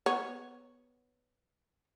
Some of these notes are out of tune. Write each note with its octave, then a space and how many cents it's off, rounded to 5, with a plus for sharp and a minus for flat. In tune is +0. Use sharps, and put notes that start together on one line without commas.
B3 +0 C#5 +0